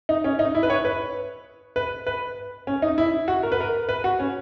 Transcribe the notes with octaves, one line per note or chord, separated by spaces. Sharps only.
D#4
C#4
D#4
E4
B4
C#5
B4
B4
B4
C#4
D#4
E4
F#4
A#4
B4
A#4
B4
F#4
C#4